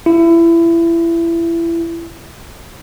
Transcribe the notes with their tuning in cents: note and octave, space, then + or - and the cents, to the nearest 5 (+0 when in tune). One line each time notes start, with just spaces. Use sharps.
E4 +25